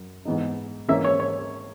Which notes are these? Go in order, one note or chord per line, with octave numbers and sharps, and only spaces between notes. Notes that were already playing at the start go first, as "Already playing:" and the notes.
Already playing: F#2
G#2 E3 B3 D#4
G#2 E3 A#3 C#4 E5
C#5
C#5